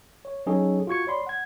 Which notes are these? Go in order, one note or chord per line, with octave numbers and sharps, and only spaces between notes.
C#5
F#3 C#4 D#4 G#4 A4 C#5
F4 F#4 C#6 G#6 C#7
C#5 D5 B5 C6
F#5 G#6